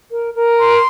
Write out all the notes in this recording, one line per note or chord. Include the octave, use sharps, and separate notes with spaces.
A#4
A#4
C6